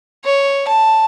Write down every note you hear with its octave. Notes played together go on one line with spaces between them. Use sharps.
C#5
A5